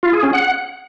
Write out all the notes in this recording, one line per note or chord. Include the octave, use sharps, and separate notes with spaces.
F4
G#4
C#4
F#5